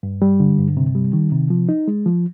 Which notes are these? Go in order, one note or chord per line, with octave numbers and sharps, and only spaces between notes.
G2
G3
D3
G2
C3
G3
D#3
C3
F3
D#4
G#3
F3